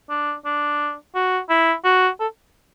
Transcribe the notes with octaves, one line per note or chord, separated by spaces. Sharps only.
D4
D4
F#4
E4
F#4
A4